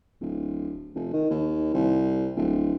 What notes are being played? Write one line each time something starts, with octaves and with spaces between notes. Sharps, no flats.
D1
F1
D#3
D#2
C2
D1